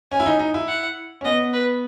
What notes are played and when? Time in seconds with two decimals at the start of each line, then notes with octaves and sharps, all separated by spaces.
0.11 C#4 G#5
0.20 E4
0.26 D#4
0.39 D#4
0.54 E4
0.68 F#5
1.21 C#4
1.25 B3 D#5
1.53 B4